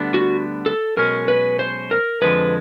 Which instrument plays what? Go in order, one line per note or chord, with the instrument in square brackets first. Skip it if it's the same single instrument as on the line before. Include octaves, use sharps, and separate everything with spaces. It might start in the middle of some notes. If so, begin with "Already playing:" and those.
Already playing: [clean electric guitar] D2 D3 G3 B3 D4
[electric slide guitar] F#4
A4
[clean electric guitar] B1 B2 G#3 C#4 [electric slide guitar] A#4
[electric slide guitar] B4
C5
A#4
[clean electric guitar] F2 D3 F3 G#3 [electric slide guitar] B4